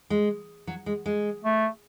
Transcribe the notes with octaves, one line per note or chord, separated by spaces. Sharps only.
G#3
F#3
G#3
G#3
A3